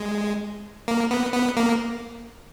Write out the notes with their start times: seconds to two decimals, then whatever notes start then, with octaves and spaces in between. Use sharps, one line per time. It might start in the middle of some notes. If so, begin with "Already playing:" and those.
Already playing: G#3
0.88 A#3
1.11 B3
1.33 B3
1.57 A#3